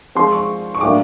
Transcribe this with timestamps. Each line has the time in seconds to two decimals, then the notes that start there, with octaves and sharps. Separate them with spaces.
0.15 F3 G#3 C4 F4 C6
0.32 C#6
0.75 C#6
0.81 A2 F#3 A#3 D4 F4 D6